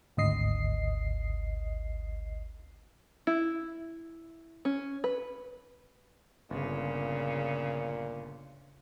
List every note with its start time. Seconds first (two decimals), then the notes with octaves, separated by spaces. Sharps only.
0.17 G#1 D2 D#5 C7
3.27 E4
4.65 C#4
5.04 B4
6.50 G1 A#2 C#3